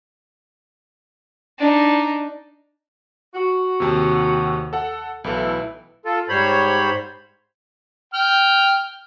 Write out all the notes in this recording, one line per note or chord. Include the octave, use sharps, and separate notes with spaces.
D4 D#4
F#4
D#2 C3
A4 F#5
B1 A2 E3 A4
F4 A4
G#2 G3 C5 C#5 B5
G5 F6